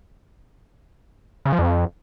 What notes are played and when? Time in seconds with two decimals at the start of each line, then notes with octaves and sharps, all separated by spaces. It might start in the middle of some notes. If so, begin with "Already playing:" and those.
1.45 C#3
1.52 F3
1.59 F2